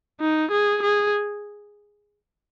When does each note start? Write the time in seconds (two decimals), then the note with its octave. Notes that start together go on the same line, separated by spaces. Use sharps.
0.21 D#4
0.51 G#4
0.82 G#4